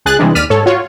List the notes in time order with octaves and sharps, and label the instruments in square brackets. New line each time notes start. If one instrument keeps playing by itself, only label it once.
[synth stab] C#2 G#4 F#6 A6
C3 E3 G3 G#3 D4
D#2 D5 F6 B6 D#7
G#2 A4 C#5
F4 F#4 C#5